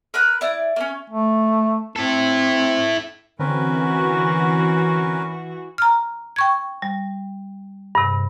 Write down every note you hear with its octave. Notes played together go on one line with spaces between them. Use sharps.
A#4 B4 B5 F#6
E4 D5
A#3 C#4
A3
C4 E4 A4
D3 E3 C4 C#4 F#4 A#4 B4
A#5 F6
G5 C#6 G#6
G3
G2 C3